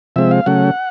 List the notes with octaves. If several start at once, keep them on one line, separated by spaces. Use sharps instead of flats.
C3 F3 G#3 C4 E5
F5
C#3 F#3 A3 C#4 F#5